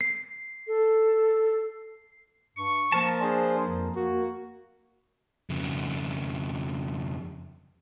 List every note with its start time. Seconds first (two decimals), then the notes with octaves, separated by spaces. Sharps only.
0.01 C7
0.67 A4
2.57 G2 C#6
2.92 F3 A#3 A#4 A5
3.21 D4 G#4 C5
3.64 F2
3.96 A#3 F#4
5.50 F2 C#3